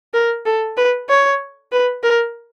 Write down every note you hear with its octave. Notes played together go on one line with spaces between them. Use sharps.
A#4
A4
B4
C#5
B4
A#4